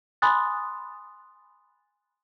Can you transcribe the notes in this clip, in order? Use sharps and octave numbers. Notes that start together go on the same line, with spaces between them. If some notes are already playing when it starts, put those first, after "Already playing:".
G#5 B5 C6 D#6 F#6 A6